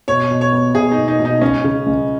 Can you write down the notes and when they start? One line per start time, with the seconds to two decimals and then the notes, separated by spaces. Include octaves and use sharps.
0.08 B2 C#5
0.31 B2
0.41 C#5
0.52 B3
0.75 B2 G#4
0.92 D#4
0.97 B2
1.08 D#4
1.19 B2
1.25 D#4
1.41 C#2 C#4
1.64 C#3
1.86 C#2